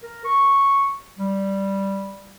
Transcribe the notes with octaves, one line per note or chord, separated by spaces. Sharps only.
A#4
C#6
G3